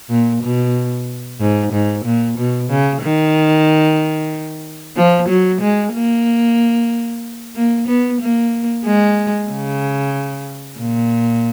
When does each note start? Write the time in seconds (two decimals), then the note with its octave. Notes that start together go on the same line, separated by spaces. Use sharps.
0.10 A#2
0.42 B2
1.40 G#2
1.72 G#2
2.05 A#2
2.37 B2
2.70 C#3
3.02 D#3
4.97 F3
5.28 F#3
5.61 G#3
5.93 A#3
7.56 A#3
7.87 B3
8.21 A#3
8.85 G#3
9.50 C#3
10.79 A#2